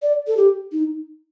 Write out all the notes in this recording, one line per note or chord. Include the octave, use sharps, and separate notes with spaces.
D5
A4
G4
D#4